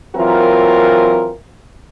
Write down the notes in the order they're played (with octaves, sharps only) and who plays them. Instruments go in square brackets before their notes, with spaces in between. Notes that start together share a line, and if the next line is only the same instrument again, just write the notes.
[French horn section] E3 F#3 C4 F4 A#4